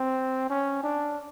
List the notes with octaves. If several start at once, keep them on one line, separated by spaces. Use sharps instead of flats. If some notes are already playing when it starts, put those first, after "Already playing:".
Already playing: C4
C#4
D4